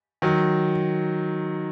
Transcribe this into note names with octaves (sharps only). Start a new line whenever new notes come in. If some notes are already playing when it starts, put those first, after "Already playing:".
D#3 F#3